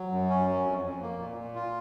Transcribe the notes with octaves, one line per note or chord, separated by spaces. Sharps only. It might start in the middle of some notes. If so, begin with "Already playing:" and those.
Already playing: F#3
F#2
C#4
F#3
F2
F2
A#3
A#2
A#2
F4